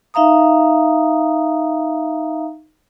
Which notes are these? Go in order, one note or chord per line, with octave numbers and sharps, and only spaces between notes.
D#4 E5 F5 A#5 D#6